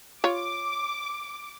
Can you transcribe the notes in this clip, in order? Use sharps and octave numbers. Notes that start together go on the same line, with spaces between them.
F4 C#5 D6